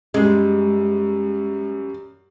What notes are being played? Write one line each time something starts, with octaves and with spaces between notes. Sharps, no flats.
F#2 G3 G#3